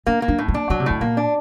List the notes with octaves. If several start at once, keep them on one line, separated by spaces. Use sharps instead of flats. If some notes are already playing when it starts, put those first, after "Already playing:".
A#3 D4
A#3
D4
A2
A#3
D4
D3 F#3
C3
A2 D3
A#2 A#3
D4